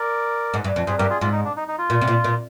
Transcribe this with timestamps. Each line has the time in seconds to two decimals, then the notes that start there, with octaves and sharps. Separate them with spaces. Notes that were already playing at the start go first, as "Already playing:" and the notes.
Already playing: A#4 D5
0.54 G#2
0.64 G2
0.76 F2
0.87 G2 G#4 C5
0.98 G2 G4 A#4
1.10 F4 G#4
1.21 G#2 F4
1.33 D#4
1.45 D4
1.56 D#4
1.68 D#4
1.78 F4
1.90 A#2
2.01 C3
2.08 A#2
2.24 A#2